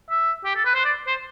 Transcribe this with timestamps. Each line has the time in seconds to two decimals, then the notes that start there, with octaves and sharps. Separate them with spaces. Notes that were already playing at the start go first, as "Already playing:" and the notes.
0.10 E5
0.45 G4
0.55 A4
0.65 B4
0.75 C5
0.84 D5
1.07 C5